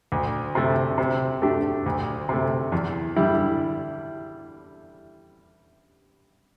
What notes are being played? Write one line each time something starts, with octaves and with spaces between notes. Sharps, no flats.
D2
C3 A3
C3
A3 D4 G4
D2
C3 A3
E2
D3 G3 E4